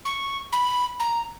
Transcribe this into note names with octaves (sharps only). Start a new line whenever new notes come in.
C#6
B5
A#5